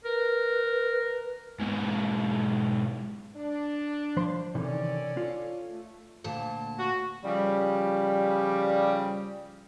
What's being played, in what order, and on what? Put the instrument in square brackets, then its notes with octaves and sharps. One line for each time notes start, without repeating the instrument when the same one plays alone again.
[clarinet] A#4 [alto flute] B4
[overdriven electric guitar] G#2 B2
[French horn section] D4
[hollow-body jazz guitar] F3 C5 C6
[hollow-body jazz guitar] C3 D#3 E3 [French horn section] C#4 A4 D5
[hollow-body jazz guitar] F4
[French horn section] A3
[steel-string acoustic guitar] D2 A#2 A5
[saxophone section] F#4
[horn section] C#3 F3 G3